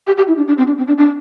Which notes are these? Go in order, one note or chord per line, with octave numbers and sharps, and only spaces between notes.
G4
G4
E4
D4
D4
C4
D4
C4
D4
D4